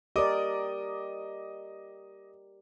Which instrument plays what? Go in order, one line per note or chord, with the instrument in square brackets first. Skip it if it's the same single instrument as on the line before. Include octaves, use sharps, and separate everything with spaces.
[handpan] G4 A#4 D5 [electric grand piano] D#5 D6 D#6